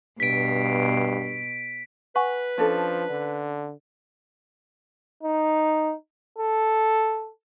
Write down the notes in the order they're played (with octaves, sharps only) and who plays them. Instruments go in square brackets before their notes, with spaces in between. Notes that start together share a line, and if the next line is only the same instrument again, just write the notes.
[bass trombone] G2 [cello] B2 [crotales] B6 D7
[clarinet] B4 [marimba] F#5 G#5 C#6
[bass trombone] F3 [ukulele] C#4 D4 A4
[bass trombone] D3
[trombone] D#4
A4